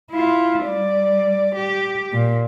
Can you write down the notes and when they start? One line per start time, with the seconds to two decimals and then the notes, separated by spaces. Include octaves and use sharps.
0.11 E4 F4
0.65 G3 D5
1.55 G4
2.13 A#2